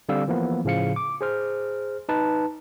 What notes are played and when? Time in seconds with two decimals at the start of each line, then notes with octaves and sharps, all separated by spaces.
0.09 D3 G3 C4 F5 E6
0.28 E3 F3 A#3 B3
0.64 A2 C#3 F3 F5 C#7
0.96 D6
1.21 G#4 C5 F6
2.09 D#4 B4 A5